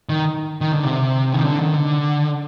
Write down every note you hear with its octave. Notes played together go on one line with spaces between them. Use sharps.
D#3
D#3
D3
C3
D#3
D3
D#3
D3